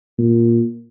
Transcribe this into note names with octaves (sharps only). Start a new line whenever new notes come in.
A#2